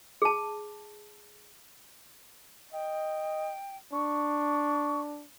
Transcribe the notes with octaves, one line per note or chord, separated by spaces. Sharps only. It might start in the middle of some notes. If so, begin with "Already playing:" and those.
G#4 A5
D#5 G5
D4 C#6